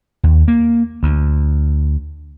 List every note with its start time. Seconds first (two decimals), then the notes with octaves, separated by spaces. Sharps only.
0.23 D#2
0.48 A#3
1.03 D2